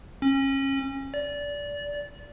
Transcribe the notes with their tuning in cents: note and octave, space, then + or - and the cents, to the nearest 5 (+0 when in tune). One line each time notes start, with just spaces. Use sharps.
C#4 -30
D5 -20